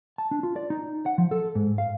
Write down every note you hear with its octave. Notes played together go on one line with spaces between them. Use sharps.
A5
D4
F4
D5
D#4
F#5
F3
A4
G#2
F5